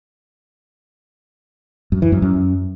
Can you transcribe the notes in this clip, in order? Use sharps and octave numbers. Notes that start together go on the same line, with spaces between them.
F#2
E3
F#2
F#2